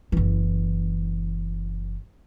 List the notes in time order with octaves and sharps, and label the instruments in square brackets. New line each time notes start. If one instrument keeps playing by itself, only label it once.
[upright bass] F#1 E3